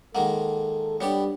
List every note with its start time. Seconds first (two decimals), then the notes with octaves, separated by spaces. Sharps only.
0.15 D#3 G#3 A#3 A4 F#5
1.01 G3 B3 D4 G4 C#5 D5